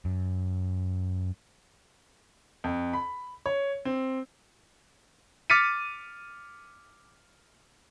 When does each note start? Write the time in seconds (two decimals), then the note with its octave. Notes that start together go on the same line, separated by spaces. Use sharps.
0.05 F#2
2.64 F2
2.93 B5
3.46 C#5
3.85 C4
5.50 D6 F6 A6 B6 C#7 D#7